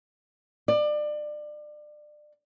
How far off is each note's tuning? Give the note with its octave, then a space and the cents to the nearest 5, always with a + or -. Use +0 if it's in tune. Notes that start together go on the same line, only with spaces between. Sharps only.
D5 +30